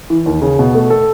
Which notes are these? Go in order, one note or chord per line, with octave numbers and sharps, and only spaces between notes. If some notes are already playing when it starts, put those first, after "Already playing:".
E3
D#2
C#3
B2
A3
A4